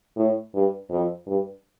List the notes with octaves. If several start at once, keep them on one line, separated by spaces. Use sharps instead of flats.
A2
G2
F2
G2